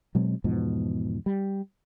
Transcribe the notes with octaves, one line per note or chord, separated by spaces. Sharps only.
B2 F#3 G#3 C4
E2 G#2 B2 F3
G3